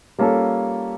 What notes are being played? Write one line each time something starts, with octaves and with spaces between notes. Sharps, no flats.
G3 A#3 C#4 F4 A4